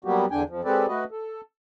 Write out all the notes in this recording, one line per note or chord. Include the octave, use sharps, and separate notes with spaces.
F#3 G3 A#3 B3 F#4 G4
E2 D3 D4 G5 G#5
F2 F3
G#3 C4 G4 A4 B4 D5
A3 F#4 B4 D#5
A4